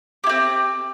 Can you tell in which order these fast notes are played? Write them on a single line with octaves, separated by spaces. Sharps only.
G4 E4 C4